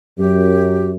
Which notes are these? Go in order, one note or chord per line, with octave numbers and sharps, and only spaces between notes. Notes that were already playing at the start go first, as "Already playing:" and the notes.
F#2 G4